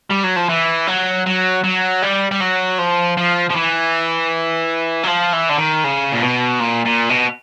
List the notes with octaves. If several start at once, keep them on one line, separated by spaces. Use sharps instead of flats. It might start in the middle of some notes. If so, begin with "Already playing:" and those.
G3
F#3
F3
E3
F#3
F#3
F#3
G3
G3
F#3
F3
F3
F3
E3
F#3
F3
E3
D3
D#3
C#3
A#2
B2
A#2
A#2
B2